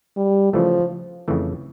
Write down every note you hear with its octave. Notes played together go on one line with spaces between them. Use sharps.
G3
C#3 E3 F3 A3
F2 C#3 E3 A3